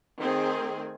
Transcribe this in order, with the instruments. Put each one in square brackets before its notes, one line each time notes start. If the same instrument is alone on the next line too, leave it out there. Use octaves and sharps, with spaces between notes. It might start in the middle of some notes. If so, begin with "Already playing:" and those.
[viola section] D#3 A3 C4 G#4